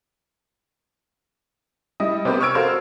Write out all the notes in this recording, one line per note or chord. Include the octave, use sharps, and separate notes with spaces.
G3 E4 D#5 D#6
C3 B3 C4 G4 A#4 C5
C#6 E6 F6 G#6 D7
F#4 A4 A#4 C5 F5